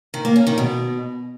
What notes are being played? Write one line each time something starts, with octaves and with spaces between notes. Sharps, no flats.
D#3
A#3
C#4
D#3
B2